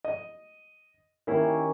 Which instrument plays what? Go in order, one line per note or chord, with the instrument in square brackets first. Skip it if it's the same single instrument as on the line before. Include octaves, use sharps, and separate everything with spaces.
[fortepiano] D#5
[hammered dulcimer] D#3 C#4 G4 [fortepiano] A#3 E4